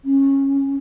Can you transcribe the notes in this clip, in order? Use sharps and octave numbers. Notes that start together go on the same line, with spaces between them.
C#4